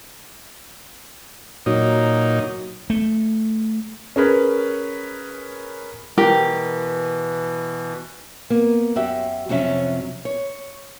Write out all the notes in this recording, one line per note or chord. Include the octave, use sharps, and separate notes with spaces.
A#2 F#3 D#4
A3
C#4 G#4 A#4 B4 C#5
B2 E3 G4 A#4
A#3 B3
F#2 F#4 G4 E5
F2 C3 F#3 C#4 E5
C#5